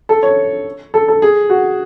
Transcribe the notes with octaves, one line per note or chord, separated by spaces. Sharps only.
A4
C#5
A4
A4
G#4
F#4